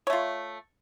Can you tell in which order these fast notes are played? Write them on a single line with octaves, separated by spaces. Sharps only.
C#5 A3 F4